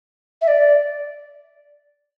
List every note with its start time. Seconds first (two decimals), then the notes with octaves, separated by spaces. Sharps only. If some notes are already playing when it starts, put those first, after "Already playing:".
0.41 E5
0.48 D5